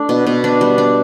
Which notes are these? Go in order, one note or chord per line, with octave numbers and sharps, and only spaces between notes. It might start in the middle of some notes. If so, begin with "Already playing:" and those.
Already playing: A3 D4
B2
B2
D4
G3
D4